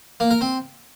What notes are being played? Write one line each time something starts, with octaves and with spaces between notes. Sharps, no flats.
A#3
A#4
C4